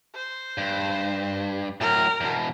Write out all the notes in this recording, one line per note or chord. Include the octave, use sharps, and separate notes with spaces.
C5
G2
A2 F#3 A#4
E2 B2